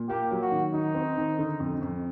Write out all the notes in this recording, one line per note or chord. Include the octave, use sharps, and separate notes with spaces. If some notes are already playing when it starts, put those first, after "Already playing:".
Already playing: A#2
A#3 G4
F#3
F#4
D#3
D#3 D#4
C4
D#3
D3
F2
F2